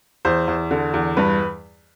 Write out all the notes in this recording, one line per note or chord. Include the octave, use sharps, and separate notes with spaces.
E2 C5
E2
D3
E2
G2 B4